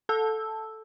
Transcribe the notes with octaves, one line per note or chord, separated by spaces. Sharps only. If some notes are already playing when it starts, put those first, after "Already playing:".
A4 A5 E6